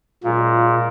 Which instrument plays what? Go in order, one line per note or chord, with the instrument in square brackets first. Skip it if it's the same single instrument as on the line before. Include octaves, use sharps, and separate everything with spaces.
[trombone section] F#2 G#3 F4 [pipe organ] A#2